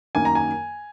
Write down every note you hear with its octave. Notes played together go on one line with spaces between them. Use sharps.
F#2 D#3 A#3 G#5
A#5
G#5